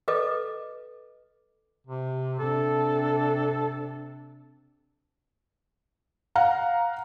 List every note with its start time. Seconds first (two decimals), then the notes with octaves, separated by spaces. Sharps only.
0.08 A4 B4 D#5 D6
1.87 C3
2.39 C3 D4 A4
6.35 F5 F#5 A#5